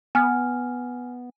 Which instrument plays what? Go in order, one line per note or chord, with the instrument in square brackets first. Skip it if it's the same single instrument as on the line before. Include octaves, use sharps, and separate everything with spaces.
[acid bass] B3 [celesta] G#5 F6